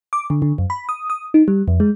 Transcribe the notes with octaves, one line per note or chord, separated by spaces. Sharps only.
D6
D3
D3
F#2
B5
D#6
D#6
D#4
G3
F2
G#3